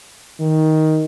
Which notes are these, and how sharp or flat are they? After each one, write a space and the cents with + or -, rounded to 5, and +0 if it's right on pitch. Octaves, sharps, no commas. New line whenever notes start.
D#3 +10